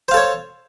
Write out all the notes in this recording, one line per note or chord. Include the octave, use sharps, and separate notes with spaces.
A4 C5 C#5 F5